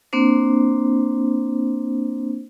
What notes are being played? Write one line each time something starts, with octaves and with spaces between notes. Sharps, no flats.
A#3 C4 D4 C5